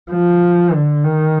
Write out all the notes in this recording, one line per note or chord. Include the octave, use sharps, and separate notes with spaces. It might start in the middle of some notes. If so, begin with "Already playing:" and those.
F3
D3
D#3